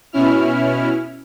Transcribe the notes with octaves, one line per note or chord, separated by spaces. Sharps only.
B2 C#4 E4 F6